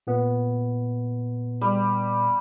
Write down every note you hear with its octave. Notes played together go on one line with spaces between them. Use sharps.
A#2 B3
G3